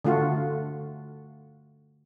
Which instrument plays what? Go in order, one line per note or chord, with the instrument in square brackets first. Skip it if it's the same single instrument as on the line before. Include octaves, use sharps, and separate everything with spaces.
[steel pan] D3 A3 F4 F#4